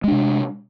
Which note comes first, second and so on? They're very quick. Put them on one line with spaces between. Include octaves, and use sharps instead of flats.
G#3 D4 C3